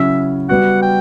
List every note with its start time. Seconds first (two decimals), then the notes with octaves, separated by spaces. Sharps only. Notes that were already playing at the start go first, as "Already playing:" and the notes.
Already playing: C#3 F#3 C#4 E4 E5
0.49 G3 B3 F#4 F#5
0.82 G5